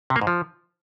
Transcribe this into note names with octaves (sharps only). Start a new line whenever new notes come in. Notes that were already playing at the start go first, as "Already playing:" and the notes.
C3
A#3
G#2
F3